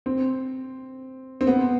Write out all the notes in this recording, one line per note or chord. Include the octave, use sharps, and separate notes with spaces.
C4
C4
B3